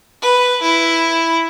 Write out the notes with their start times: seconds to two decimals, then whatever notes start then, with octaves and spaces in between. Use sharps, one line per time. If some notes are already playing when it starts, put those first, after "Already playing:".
0.22 B4
0.62 E4